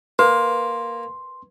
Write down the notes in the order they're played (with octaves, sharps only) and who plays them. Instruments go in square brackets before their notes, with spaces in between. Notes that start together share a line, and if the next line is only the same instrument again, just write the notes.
[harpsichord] A#3 [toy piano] B4 [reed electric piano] C6